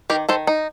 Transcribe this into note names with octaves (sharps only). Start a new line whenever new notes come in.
D#3 G4 A#4
D#3 A4 C5
D#4